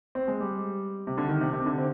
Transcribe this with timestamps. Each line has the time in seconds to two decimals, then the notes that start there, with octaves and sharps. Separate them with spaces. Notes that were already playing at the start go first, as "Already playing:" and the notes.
0.15 C4
0.28 G#3
0.40 G3
1.07 C3
1.18 D3
1.28 D#3
1.41 C3
1.53 C3
1.66 D3
1.78 C4